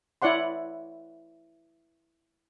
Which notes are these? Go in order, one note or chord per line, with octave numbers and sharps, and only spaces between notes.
E4 C#5 D5 F#5 C6